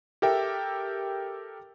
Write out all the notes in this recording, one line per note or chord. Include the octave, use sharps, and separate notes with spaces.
G4 A4 A#4 E5 G5